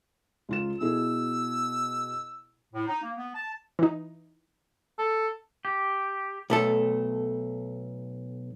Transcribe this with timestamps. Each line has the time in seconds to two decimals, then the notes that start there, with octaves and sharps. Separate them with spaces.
0.49 C#2 F4 E7
0.81 B2 E4 G#4 E6
2.74 A2
2.87 D#4
3.02 A#3
3.17 B3
3.34 A5
3.79 E3 D#4
4.99 A4
5.65 G4
6.50 B1 A3 A4